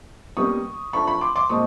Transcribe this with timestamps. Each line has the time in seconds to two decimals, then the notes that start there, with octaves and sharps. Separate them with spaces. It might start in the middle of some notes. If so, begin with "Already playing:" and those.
0.37 B2 G3 A#3 C#4 C#6 D#6
0.93 F3 A3 D4 B5 C#6
1.07 B5 C#6
1.21 C6 D6
1.36 C6 D6
1.50 A#2 F3 G#3 C4 C#6 D#6